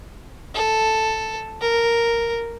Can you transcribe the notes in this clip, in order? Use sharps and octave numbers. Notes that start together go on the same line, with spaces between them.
A4
A#4